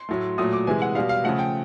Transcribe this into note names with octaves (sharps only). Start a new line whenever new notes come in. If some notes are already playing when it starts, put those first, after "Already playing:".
Already playing: C6
A2 F#3 A3
A#2 F#3 A3 D#6
D6
C3 E3 G#3 G#5
F#5
B2 G3 F5
F5
C#3 F3 A3 F#5
G5